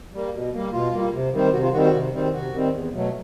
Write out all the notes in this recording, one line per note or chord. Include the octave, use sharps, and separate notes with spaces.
G3 A#3
B2
G3 A#3
B2 F4
G3 A#3
C3
D#3 G3 C4
C3 F#4
F4
D#3 G3 C4 F#4
F#4
C3
D#3 G3 C4
C3 F#4
D#3 G3 C4
E2
B2 F#3 A3